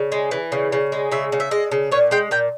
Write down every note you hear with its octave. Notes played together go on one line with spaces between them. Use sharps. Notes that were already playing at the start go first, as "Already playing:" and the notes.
Already playing: C#3
G#3
E3
C#3
C#3
G#3
C#3 E5
C#3
E5
G#3 D#5
C#3
A#2 C#5
G#3 G5
A#2 G5